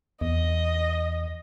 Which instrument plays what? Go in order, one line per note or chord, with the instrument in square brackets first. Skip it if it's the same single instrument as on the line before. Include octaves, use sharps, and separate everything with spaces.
[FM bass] E2 [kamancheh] D#5